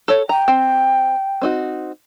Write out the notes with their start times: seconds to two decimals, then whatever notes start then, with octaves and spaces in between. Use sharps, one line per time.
0.08 A4 C#5
0.29 G5 A#5
0.48 C4
1.42 C4 D#4 F#4